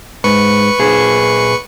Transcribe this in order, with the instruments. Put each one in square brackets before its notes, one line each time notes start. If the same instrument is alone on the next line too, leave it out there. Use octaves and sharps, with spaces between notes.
[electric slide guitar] G#2 [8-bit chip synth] B4 C#6 C#7
[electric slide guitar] A#2 G#4